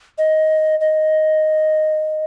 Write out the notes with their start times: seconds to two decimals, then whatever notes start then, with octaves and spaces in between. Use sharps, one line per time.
0.18 D#5
0.81 D#5